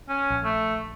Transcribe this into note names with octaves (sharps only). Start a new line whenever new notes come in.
C#4
A#1
A3